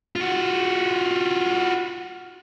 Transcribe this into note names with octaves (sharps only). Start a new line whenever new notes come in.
F4 F#4